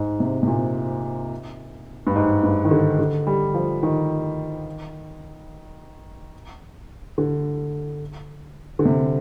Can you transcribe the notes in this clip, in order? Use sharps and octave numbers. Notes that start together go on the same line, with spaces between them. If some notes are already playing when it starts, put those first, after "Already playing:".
Already playing: G#2
C3
C3
A#2
G2
G#2
G2
D#3
D3
D3
G3
F3
D#3
D3
D3
C3